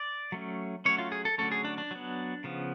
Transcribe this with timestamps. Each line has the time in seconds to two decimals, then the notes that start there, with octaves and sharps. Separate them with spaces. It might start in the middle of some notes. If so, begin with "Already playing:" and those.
Already playing: D5
0.32 F#3 A3 C#4
0.85 F#3 A3 C#4 C#5
0.98 F4
1.12 G#4
1.25 A4
1.38 D3 F#3 A3 C#4 A4
1.52 G#4
1.65 D4
1.78 D4
1.91 F#3 B3
2.44 C#3 F3 B3